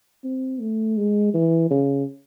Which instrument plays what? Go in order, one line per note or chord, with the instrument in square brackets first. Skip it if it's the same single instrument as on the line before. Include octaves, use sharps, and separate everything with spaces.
[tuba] C4
A3
G#3
E3
C#3